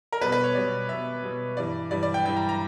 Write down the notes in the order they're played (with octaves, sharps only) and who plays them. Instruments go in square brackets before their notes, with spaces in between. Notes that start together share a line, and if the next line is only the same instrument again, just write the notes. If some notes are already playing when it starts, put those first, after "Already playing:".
[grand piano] A#4
B2 G3 B3 B4
B4
C#5
B2 G3 B3 D5
B2 G3 B3 E5
B2 G3 B3
G2 E3 G3 D5
G2 E3 G3 D5
D5
G5
G2 E3 G3 G5
A#5
A#5